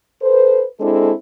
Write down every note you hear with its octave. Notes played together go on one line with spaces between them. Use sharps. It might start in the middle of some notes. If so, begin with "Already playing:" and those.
A4 B4 C5
G#3 C4 D4 E4 A4